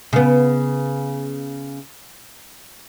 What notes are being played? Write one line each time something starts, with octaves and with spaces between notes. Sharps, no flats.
C#3 B3